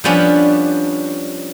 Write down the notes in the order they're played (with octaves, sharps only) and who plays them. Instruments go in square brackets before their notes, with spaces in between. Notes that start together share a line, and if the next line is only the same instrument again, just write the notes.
[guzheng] F3 G3 B3 C#4 D4